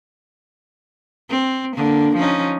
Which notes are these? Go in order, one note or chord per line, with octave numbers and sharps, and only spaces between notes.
C4
D3 A#3
F3 C#4 D#4